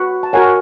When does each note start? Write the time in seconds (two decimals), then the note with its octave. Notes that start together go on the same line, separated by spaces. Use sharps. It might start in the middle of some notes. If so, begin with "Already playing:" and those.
Already playing: F#4 B4
0.23 A5
0.33 F#4 A#4 C#5 F#5 G#5